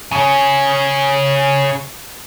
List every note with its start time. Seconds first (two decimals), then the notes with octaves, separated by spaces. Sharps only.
0.12 C#3 C#4